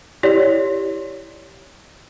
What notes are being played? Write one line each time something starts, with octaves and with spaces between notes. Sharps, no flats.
E4 G4 C#5 D5